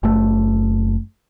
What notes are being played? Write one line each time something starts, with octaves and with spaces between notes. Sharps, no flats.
F#1 A3